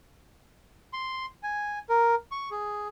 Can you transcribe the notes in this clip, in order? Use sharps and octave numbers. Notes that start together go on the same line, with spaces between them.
C6
G#5
A#4
C#6
G#4